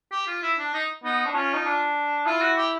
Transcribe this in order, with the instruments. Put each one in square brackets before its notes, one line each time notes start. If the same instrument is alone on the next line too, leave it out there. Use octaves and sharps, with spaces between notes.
[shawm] G4
F4
E4
D4
D#4
[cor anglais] B3 [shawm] D#4
[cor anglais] D4
[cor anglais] C#4 [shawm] F4
[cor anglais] D#4
D4
[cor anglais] E4 [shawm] F4
[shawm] F#4
G4